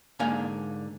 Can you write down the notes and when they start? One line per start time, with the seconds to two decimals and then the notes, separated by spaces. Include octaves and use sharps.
0.19 G#2 D3 A#3 F5 G#5